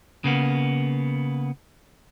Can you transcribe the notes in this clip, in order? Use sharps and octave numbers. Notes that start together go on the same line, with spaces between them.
C#3 A#3 B3